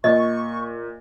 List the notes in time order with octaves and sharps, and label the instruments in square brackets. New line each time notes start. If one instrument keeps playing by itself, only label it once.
[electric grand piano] A#2 [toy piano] D#5 [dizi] C#6